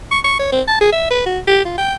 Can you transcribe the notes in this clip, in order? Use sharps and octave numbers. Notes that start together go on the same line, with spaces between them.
C#6
C#6
C#5
C4
A5
G#4
E5
B4
F#4
G4
F4
G5